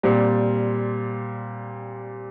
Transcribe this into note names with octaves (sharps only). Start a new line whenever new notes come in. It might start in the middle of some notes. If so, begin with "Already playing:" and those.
A#2 G3 C4